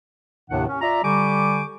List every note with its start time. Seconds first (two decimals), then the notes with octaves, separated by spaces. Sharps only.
0.49 D#2 A2 C3 D#3 D4 F#5
0.68 C#4
0.81 F4 D5 E5 A#5
1.03 D3 G3 G4 G#5 C#6 D6